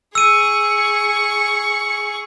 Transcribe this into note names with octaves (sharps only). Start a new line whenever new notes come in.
G#4 C#6 E6 D#7